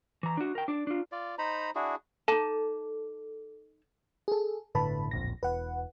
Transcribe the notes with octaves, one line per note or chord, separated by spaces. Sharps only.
E3 A#5
D4 F#4
A#4 G5
D4 D5
D4 F4
F4 D5
D#4 C5 A#5 B5
D4 E4 F#4 G#4
D#4 A4 A5
G#4 A4
G1 A2 D3 B4 A5 B5
D1 A#1 F2 A#6
E1 B4 F#5